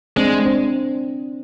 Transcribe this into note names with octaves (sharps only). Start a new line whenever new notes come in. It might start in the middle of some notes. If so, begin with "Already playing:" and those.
G#3 C4 D4
C4 D4